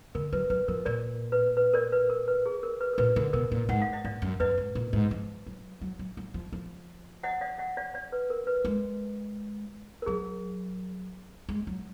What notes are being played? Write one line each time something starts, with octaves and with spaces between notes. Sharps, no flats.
D3 A#4
F#3 B4
F#3 B4
F3 A#4
A#2 A#4 D5
B4
B4
A#4 D5
B4
A#4
B4
G#4
A#4
B4
A#4
A#2 B4
D3 A#4
B2 A#4
A#2
G#2 F#5
F5
D#5
G#2 D5 F5
F#2
F#2 B4 D#5
G#2
A#2
G#2
F3
F#3
F#3
F#3
F#3
F3
F3
D#5 F#5
D5 F5
D#5 F#5
D5 F5
D5 F5
B4
A#4
B4
G#3
A#4
F#3 G#4
G#3
F#3